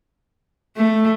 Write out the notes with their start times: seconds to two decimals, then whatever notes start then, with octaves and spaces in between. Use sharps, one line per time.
0.77 A3